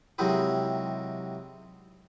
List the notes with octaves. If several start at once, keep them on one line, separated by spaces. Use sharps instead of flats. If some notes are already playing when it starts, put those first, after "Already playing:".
C3 D#3 F#3 G#3 E4 G4